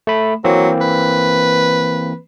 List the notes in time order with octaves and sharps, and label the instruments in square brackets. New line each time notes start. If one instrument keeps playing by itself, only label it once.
[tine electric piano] A3 B5
[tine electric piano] E3 A#3 C4 [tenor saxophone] F#3
[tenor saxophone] B4